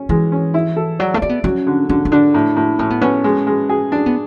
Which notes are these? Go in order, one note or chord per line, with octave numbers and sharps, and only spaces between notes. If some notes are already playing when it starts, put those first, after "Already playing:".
Already playing: C#4
E3 G#3
C#4
E4
A4
F#3 D5
A3
C#4 D5
B3
F#3 C#4
D3
D3 C#4
C#4
D3 D4
A2
A2
A2 C#4
B3
B3 C#4
G#3
G#3
G#4
D4
B3